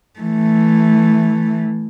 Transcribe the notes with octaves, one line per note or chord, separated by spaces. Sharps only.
E3 A3